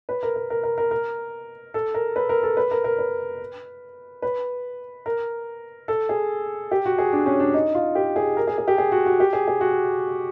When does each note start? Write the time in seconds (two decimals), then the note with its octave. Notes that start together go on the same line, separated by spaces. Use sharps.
0.09 B4
0.23 A#4
0.36 A#4
0.50 A#4
0.63 A#4
0.78 A#4
0.91 A#4
1.74 A4
1.94 A#4
2.16 B4
2.29 A#4
2.43 A4
2.57 B4
2.71 A#4
2.84 A#4
2.98 B4
4.22 B4
5.06 A#4
5.88 A4
6.09 G#4
6.71 G4
6.85 F#4
6.98 G#4
7.13 D4
7.26 C#4
7.40 D4
7.54 D#4
7.75 F4
7.95 G4
8.16 G#4
8.37 A#4
8.47 G#4
8.58 G#4
8.68 G4
8.78 G#4
8.92 F#4
9.06 F#4
9.20 G4
9.33 G#4
9.48 G#4
9.61 F#4